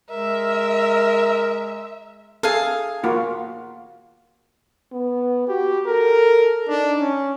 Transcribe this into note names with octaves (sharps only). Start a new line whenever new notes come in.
G#3 A#4 E5
G#4 A4 F5
A#3 F4 F#4
B3
F#4 G4
A4 A#4
D4 D#4
C#4